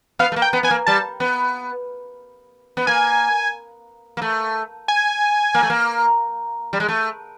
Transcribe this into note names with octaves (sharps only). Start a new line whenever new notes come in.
B3 F5
A3
A#3
G5
B3
B3 G#5
A#3
G3 A5
B3
B3
A#3 G#5
A#3
A3
G#5
A#3
A3
A#3
G3
G#3
A3